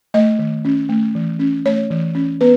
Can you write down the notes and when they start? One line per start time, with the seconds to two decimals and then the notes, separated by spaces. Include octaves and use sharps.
0.14 A3 D#5
0.39 D#3
0.65 C#4
0.89 A3
1.15 E3
1.39 C#4
1.66 A3 C#5
1.90 E3
2.15 C#4
2.41 B3 B4